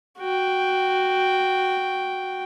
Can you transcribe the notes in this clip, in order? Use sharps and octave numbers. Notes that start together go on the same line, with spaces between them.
F#4 G5